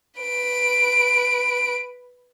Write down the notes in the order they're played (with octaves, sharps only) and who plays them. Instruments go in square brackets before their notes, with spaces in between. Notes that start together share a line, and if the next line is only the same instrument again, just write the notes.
[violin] B4 D7